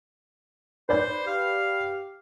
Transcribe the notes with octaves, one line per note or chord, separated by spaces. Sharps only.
B4 C5 D5 G6
G4 F5